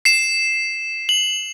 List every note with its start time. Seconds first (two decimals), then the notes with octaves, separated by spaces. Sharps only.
0.05 C7 E7
1.09 F#7